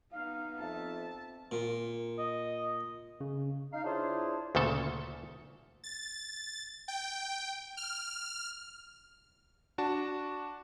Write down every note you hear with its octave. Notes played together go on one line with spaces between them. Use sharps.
B3 D#4 F5
F2 E5 A5
A#2
D#5
C#3
D#4 F5
D4 E4 F4 G#4 C5 C#5
D2 A#2 C#3 A4 A5
A6
G5
F6
D4 F#4 A5